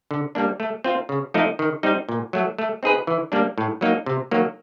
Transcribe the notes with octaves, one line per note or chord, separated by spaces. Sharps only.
D3
G3 A#3 D4
A3
C4 F4
C#3
F3 A3 C4 D#4
D#3
G3 C4 D#4
A#2
F#3 A3
A3
C4 D#4 G#4 B4
E3
G3 A#3 D4
A2
F#3 A#3 D#4
C3
D#3 F#3 A#3